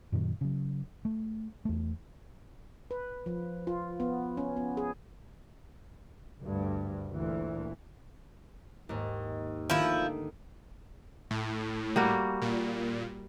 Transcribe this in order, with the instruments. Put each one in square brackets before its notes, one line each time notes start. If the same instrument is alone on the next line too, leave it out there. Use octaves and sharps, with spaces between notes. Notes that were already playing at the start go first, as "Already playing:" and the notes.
[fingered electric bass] F#2 A#2 D#3 F#3
C#3 F#3
A3
E2 A3
[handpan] B4
F3
F4
B3
C#4
B3
G#4
[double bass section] D2 G2
D2 A#2 E3
[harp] D#2 G#2
[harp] D2 D#3 D4 [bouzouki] F3 E4
[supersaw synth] A2
[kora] G3 A#3 F#4
[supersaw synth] A#2